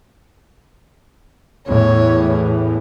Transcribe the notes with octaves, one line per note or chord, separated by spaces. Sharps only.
E2 A2 E3 C#5